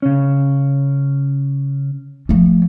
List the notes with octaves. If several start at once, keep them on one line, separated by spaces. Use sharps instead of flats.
C#3 C#4
F3 A3